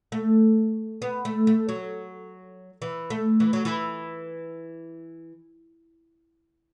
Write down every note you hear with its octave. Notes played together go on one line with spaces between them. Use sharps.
A3
B3
A3
A3
F#3
E3
A3
E3
F#3
E3